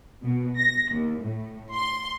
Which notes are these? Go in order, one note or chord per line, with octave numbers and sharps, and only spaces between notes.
B2
A#6
D#2
A2
C6